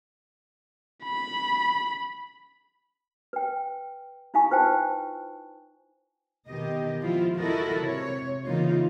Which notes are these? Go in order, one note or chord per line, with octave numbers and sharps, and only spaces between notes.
B5
B4 G5
D#4 E4 F5 G#5 C#6
F4 B4 C5 G5 A5
B2 D#3 G4 D#5
F3 B3 E4 F4
F3 E4 F#4 A4 A#4 D#5
C3 C#5
C#3 E3 A#3 D#4 F4